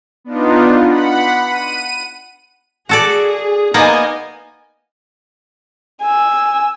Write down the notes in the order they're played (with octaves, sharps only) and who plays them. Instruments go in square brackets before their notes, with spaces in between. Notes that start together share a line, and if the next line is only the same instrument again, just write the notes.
[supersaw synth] B3 D4 D#4 F4
F#5 B5
D#7
[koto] F#4 A4 D5 [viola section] G#4
[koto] A#3 B3 [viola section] D#4 D#5 G#5
[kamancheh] G#5 E6